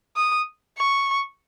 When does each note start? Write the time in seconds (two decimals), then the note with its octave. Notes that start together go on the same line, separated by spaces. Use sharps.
0.16 D#6
0.78 C#6